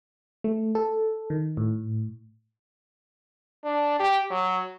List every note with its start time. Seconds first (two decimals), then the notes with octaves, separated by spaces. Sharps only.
0.44 A3
0.75 A4
1.30 D#3
1.57 A2
3.64 D4
4.00 G4
4.31 F#3